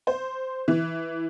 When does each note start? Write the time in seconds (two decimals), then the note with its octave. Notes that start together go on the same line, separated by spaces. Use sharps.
0.07 C5
0.68 E3